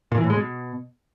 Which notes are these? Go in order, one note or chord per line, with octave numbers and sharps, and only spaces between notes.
A#2
E3
A2
G#3
B2